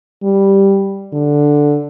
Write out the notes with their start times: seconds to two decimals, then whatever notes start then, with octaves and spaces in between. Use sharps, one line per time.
0.23 G3
1.13 D3